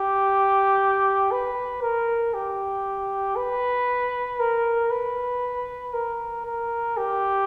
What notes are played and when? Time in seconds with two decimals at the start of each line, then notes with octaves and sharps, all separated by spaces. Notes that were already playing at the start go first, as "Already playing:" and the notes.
Already playing: G4
1.31 B4
1.82 A#4
2.34 G4
3.36 B4
4.40 A#4
4.91 B4
5.93 A#4
6.46 A#4
6.97 G4